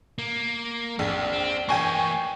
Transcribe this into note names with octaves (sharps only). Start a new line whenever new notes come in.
A#3
A#1 F2
C4
E3 A#3 G5 G#5 C#6